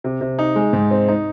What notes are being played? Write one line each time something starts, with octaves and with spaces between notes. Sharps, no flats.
C3
C3
D#4
G#3
G#2
C4
D#4